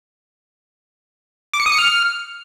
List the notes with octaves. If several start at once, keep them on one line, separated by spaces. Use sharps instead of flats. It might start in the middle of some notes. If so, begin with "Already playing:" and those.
D6
C#7
D#6
C#7
F6